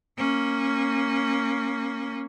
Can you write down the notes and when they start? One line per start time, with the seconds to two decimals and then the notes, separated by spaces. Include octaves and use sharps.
0.18 A#3 C#4